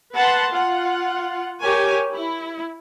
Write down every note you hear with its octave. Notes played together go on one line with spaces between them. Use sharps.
B4 F#5 A5 C6
F4 F#5
G4 A#4 C#5 G#5
E4